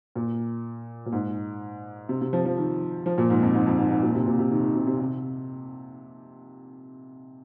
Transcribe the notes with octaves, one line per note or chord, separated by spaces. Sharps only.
A#2
A#2
G#2
C3
C3
F3
F3
D#3
F3
A#2
G#2
F2
G#2
F2
G#2
G#2
A#2
C3
A#2
C3
D#3
D#3
C3
C3
C3